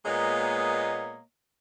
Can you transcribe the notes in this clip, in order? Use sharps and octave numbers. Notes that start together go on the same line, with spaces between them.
A#2 G#3 A#3 B3 C#5 D#5